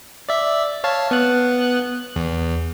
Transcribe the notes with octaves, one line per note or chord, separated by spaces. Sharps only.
D5 E5
C#5 F5 A5
B3 F#6
E2